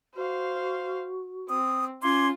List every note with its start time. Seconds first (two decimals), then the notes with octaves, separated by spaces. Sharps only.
0.15 F#4 C5 F5
1.49 C4 D#6
2.03 C#4 F4 C6 D6 G#6